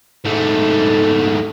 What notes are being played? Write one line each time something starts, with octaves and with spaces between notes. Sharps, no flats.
G#2 A3